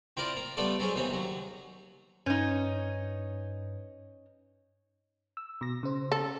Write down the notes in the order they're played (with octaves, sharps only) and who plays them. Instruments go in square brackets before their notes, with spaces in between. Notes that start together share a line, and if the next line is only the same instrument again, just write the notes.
[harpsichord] C4 E4 F4 A#4 D5
A#3
G3 A3 B3 F4 A4 D5
F#3 C4 C#4 G#4
D#2 C3 E3 B3 C4
D#2 F#3
[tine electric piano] G2 B4 G6 [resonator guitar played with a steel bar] C#4 D#4
[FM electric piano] E6
B2 A#6
C#3 C5
[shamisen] A4